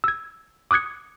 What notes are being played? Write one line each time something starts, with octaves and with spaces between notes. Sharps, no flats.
E6 G#6
D6 D#6 F#6 G#6 C#7